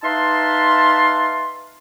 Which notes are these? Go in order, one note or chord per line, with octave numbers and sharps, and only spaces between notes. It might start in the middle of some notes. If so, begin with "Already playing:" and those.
D#4 B4 E5 F5 A5 C6